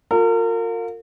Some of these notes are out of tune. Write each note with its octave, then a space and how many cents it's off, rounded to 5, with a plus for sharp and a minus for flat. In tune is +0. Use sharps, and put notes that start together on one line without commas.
F4 +35 A#4 -40